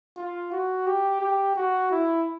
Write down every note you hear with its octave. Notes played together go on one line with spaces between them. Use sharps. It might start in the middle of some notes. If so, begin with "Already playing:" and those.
F4
F#4
G4
G4
F#4
E4